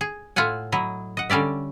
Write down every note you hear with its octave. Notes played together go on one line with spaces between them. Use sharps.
G#4
A2 F4 E5 F#5 G#5
F#3 E4 D#5
D#5 F#5
D3 G3 C#4 D5 E5